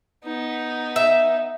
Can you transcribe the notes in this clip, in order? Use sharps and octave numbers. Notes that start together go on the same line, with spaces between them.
B3 D#4
E5